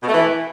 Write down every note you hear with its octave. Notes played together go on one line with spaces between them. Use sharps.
B2
A3
E3